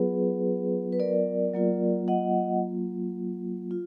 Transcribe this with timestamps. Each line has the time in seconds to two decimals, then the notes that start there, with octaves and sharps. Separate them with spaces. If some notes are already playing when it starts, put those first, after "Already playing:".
Already playing: F#3 B3 F4 G#4 B4
0.92 B4
1.00 A#4 D5
1.54 F#3 A#3 F4
2.08 D#5 F#5
3.71 F4